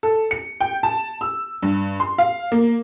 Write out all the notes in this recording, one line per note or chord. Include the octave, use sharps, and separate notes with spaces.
A4
C#7
G5
A5
E6
G2
C6
F5
A#3